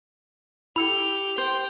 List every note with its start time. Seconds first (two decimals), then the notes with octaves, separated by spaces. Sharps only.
0.76 E4 G4 A4 C#7 F7
1.38 C5 G5